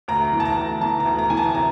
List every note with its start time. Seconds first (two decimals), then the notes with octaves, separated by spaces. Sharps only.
0.08 D2 A#5
0.33 E3
0.40 A5
0.45 A#5
0.58 D2
0.81 E3 A5
1.00 A#5
1.06 D2
1.19 A#5
1.30 E3 G#5
1.37 A5
1.55 C3 A#5